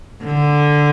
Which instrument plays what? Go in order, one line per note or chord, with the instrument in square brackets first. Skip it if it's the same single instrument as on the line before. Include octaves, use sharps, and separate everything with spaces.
[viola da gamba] D3